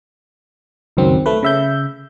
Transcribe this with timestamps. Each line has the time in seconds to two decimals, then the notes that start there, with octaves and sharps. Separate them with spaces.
0.97 C#2 F#2 D#3 F#3 C4
1.26 A3 B4
1.43 C#3 E5 G6